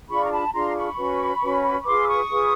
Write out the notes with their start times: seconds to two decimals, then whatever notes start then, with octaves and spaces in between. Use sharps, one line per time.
0.09 D4 F4 G#4 B5 C#6
0.25 A#5
0.31 A5 B5
0.53 D4 F4 G#4 A#5 C6
0.75 B5 C#6
0.97 C#4 F#4 B4
1.41 C#4 F#4 B4
1.85 F4 G#4 B4 C6 D6
2.03 E6
2.07 C#6 D#6
2.29 F4 G#4 B4